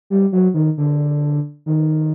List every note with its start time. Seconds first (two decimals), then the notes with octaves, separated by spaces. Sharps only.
0.10 G3
0.32 F#3
0.54 D#3
0.77 D3
1.66 D#3